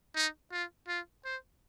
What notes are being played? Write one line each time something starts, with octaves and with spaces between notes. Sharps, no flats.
D#4
F4
F4
C5